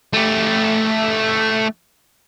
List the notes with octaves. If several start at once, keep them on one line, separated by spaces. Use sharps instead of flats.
A3 G4